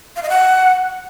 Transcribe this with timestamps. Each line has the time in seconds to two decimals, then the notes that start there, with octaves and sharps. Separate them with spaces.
0.16 F5
0.23 D#5
0.29 F#5